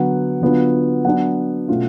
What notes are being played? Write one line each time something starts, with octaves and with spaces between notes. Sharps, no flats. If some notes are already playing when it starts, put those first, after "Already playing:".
Already playing: D3 F#3 B3 F#5
D3 F#3 B3 D4 F4
F#3 B3 D4 F#5
B2 A3 C#4 F4